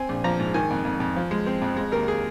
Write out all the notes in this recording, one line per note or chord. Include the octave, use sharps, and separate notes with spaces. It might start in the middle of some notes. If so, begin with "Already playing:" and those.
Already playing: C4 G#5
A#1
F3 A#5
G#2
D#3 G#5
F2
F2
F2
F3
G#3
C4
F2
G#3
D#2 A#4
G#4